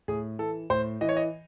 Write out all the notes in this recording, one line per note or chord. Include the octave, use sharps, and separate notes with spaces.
A2 G#4
E3 A4
A2 C5
E3 D#5
C#5
D#5